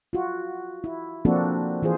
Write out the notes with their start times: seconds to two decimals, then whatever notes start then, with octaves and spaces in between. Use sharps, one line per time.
0.13 F4 F#4
0.84 E4
1.25 F3 A#3 C4 D4 F#4 A4
1.82 E3 F4 G#4 C5